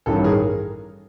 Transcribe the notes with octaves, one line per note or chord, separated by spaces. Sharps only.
A1 G2 D#3 A4
G#4 A#4